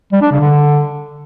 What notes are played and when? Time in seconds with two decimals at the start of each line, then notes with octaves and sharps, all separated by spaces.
0.12 G3
0.22 D4
0.31 C#3
0.41 D3